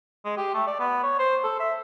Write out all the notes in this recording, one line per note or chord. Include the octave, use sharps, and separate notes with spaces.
G#3
G4
A3
D5
B3
C#5
C5
A4
E5